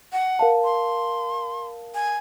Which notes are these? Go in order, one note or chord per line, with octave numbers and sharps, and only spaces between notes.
F#5
A#4 F5 A5
C6
G#5